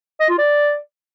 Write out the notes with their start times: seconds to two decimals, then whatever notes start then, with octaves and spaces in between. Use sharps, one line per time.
0.20 D#5
0.29 F4
0.38 D5